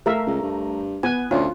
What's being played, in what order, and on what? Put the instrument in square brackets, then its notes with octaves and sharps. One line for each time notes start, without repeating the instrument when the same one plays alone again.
[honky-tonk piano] A3 A#5 [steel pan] A#4 E5 F5
[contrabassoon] C#2
G2
[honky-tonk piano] B3 F#6 [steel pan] G#5
[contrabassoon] D2 [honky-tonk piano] C#4 [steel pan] F4